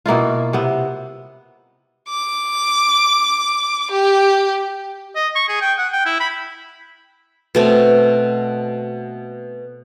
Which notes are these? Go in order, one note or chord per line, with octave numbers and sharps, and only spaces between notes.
B2 A#3 E4 F4
C3 B3
D6
G4
D#5
C#6
G#4
G5
F#5
G5
E4
B5
B2 A3 C4